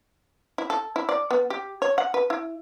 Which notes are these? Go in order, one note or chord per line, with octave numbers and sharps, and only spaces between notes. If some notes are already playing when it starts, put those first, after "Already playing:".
E4
A4
E4
D5
B3
G4
C#5
F#5
B4
E4